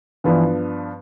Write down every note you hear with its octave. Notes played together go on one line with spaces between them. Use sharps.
G2 E3 F3 B3 D4